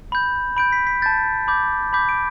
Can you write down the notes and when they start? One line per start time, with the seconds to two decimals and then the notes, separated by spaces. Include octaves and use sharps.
0.12 B5 G6
0.57 B5 G6 D7
0.72 B6
0.87 B6
1.02 A5 G6 A6
1.48 B5 D6 G6
1.93 B5 D6 G6 B6
2.09 D7